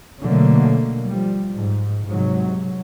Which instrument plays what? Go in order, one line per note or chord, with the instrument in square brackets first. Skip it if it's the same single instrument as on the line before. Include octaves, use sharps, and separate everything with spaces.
[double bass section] B2 D3 F#3 A3 A#3
F3 G3
G#2
G#2 C3 F#3